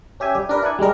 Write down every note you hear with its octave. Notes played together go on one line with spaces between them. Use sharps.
C#4 G4 E5 G#5
G3 G4
D4 A#4 B4
E4 D5 F#5 G#5
G3 G#3 D4 A#4